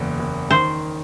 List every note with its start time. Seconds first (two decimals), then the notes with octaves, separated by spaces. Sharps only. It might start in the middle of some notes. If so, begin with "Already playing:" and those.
Already playing: F#1 E2
0.20 F#1
0.51 D#3 C5